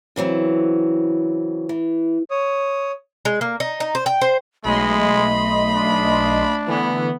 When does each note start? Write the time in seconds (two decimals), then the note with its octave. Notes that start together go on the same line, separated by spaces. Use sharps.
0.16 C#3 E3 F#3 C4
1.69 E3
2.31 C#5 D#6
3.25 G#3
3.41 A#3
3.60 D#4
3.80 D#4
3.95 C5
4.06 G5
4.21 C5
4.65 B1 G#3 A3 D#5 B5 C6
5.75 D4
6.67 D3 E3 B3